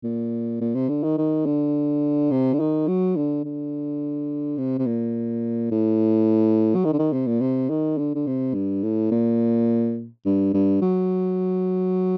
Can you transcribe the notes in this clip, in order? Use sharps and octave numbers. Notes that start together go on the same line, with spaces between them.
A#2
A#2
C3
D3
D#3
D#3
D3
C3
D3
D#3
F#3
D3
D3
C3
C3
A#2
A2
F#3
D#3
D3
D#3
C3
A#2
C3
D#3
D3
D3
C3
G2
A2
A#2
G2
G2
F#3